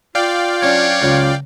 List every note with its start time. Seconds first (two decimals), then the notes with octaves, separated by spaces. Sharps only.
0.15 F4 D5 F5 G5
0.62 F#3 C#4 D4 C#5
1.02 C#2 F#3 F4